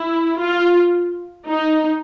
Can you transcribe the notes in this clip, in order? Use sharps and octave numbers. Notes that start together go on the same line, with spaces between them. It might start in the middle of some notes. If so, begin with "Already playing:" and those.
Already playing: E4
F4
D#4